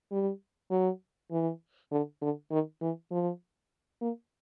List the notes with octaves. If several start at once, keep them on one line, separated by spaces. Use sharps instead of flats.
G3
F#3
E3
D3
D3
D#3
E3
F3
A#3